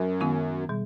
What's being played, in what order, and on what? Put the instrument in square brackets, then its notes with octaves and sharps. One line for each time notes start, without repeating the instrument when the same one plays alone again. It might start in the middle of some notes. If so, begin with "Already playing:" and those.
Already playing: [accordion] F#2
[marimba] D#3 G#3 B3 E4
B2 G3